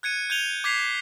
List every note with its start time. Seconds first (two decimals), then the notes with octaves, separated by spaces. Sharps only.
0.03 F#6 G#6 C#7 D#7
0.30 G6 G#6 D#7 F7 G7
0.64 D6 G#6 B6 C7 F7